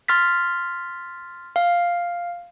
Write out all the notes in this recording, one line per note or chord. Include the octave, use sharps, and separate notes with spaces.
C6 F6 A6 B6
F5